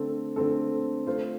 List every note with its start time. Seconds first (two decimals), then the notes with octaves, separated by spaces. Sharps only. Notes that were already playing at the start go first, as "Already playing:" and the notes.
Already playing: D3 A3 C4 A4
0.36 D3 A3 C4 A4
1.07 A3 F4 C5